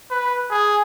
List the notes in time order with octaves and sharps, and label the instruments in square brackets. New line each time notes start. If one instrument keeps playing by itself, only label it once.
[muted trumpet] B4
G#4